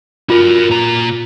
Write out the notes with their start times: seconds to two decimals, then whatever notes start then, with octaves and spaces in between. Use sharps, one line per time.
0.30 F4 F#4 A#4
0.70 A#2 A#5